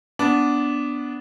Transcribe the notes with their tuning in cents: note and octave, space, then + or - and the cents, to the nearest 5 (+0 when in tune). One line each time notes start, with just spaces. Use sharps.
B3 +0 D4 -10